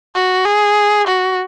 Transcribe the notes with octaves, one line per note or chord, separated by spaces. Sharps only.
F#4
G#4
F#4